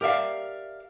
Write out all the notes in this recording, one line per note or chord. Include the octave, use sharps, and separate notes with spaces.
G4 A#4 D5 E5 F5